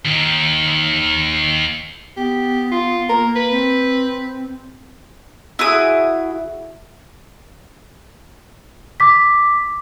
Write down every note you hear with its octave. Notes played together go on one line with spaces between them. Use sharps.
D#2 D#3
B3 G4
F4
A#3 A#4
B4
C4
E4 F#4 G#4 D#6
D6 B6